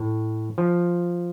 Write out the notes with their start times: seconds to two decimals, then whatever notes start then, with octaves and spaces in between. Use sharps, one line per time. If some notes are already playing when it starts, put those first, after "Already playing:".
Already playing: A2
0.58 F3